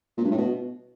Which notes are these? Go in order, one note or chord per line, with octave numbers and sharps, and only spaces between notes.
A#2
G2
A2
B2